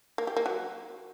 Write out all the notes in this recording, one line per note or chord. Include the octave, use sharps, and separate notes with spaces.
A#3
G4
A#3
F#3